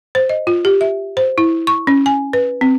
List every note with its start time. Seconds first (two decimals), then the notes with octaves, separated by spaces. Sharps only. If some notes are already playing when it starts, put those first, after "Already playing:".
0.15 C5
0.29 D#5
0.47 F4
0.65 G4
0.81 E5
1.17 C5
1.38 E4
1.67 C#6
1.87 C#4
2.06 G#5
2.33 B4
2.61 C4